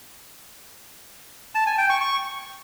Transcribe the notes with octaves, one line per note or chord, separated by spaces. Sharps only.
A5
G#5
G5
C#6
C#6